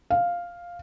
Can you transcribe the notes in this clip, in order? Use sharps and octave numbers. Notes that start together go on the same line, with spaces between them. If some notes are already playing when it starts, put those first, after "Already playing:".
F5